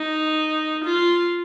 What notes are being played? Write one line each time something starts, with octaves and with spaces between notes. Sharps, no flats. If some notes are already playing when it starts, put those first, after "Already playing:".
Already playing: D#4
F4